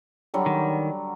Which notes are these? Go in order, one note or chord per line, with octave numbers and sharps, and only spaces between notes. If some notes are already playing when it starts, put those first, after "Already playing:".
D3 F#3 G3
D#3